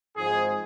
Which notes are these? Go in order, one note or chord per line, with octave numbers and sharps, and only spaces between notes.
G#1 G#2 F3 G#3 G#4